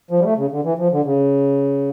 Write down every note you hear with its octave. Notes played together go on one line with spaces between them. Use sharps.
F3
G3
A3
C#3
D3
E3
F3
D3
C#3